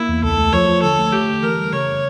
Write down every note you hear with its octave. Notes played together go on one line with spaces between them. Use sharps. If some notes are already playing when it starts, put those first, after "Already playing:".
Already playing: A#3 E4
E2
C#2 A4
A3
F3 C#5
F3
D3 A4
A3
A3 G4
D3
E3 A#4
G3
C#3 C#5